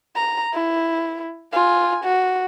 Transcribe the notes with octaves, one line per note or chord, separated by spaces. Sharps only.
A#5
E4
F4 G#5
F#4